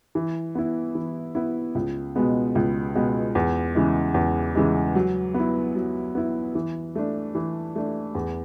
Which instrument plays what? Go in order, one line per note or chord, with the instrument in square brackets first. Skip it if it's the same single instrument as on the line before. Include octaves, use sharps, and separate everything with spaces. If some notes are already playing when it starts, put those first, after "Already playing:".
[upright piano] E3
B3 E4
E3
B3 E4
C#2
B2 G#3 B3
C#2
B2 G#3 B3
E2
C#3 E3 G#3
E2
C#3 E3 G#3
F#3
B3
E4
F#3
B3 E4
E3
A3 D4
E3
A3 D4
E2